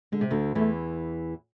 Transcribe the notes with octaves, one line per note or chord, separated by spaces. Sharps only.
D3 G#3
C3
D2 D3
E2 E3 A3